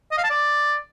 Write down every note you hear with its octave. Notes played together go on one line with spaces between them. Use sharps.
D#5
F5
A5
D5